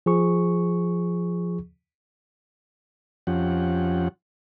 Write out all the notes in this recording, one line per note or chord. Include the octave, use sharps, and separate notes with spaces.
F3 G#4 C#6
F2 F3 C#4 G4 F#5